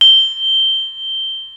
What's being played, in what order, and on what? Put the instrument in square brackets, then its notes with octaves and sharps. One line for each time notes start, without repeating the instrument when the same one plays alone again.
[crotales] G7